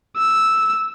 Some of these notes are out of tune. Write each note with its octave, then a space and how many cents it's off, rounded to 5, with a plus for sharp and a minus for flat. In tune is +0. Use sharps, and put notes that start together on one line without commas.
E6 -5